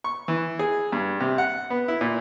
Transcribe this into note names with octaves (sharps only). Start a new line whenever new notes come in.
C#6
E3
G#4
G2
C3
F#5
B3
E4
A#2